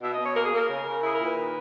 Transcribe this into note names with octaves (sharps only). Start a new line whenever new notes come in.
B2 E5
B2 D#5
C#5
A#3 A#4
G#4
A#3 A#4
C#3
C#3
E4 G#4
A#4
A#2
B4
D#3